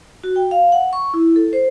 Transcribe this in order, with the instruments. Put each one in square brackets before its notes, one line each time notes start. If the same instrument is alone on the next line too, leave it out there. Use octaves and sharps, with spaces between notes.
[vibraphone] F#4
G5
F5
F#5
C#6
E4
A4
C5